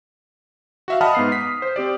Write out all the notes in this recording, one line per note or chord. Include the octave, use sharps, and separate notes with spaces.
F#4 E5 F5
D#5 F#5 A5 B5 D#6 F6
G#2 B3 C7
B6
C5
C4 G4 D5